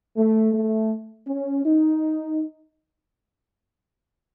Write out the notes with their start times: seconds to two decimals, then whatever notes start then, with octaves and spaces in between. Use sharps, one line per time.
0.17 A3
0.54 A3
1.27 C#4
1.65 D#4